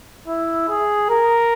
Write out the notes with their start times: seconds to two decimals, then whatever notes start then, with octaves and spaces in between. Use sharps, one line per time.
0.27 E4
0.69 G#4
1.09 A#4